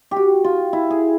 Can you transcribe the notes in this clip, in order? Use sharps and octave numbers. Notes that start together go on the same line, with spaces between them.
G4
F#4
F4
E4
G#4